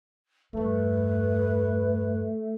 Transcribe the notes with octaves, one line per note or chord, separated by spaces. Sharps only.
E2 G2 A3 B4